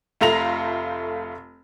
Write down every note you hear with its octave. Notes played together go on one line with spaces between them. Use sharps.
F1 A3 F4 A#5 A#6 F7